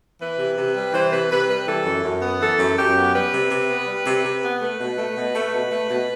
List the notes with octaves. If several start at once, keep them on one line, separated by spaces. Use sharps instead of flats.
E3 B4
C3
C3
G3
E3 C5
C3 B4
C3 B4
G3 B4
E3 A4
F#2
F#2
B3
E3 A4
F#2
F#2 G4
B3
G3 B4
C3
C3
B3
G3
C3
C3
B3
A3 B4
B2
A3
B2
A3
B2
A3
B2